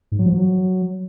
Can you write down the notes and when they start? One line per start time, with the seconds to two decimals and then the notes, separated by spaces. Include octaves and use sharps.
0.12 G#2
0.19 F#3
0.26 F3
0.33 F#3